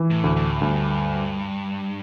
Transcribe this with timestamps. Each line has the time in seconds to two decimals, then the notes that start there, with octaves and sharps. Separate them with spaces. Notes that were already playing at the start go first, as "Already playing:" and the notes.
Already playing: E3
0.11 A2
0.24 D2
0.36 A2
0.61 D2 G2